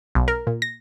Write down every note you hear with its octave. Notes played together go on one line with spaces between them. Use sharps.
B1
A#4
A#2
A#6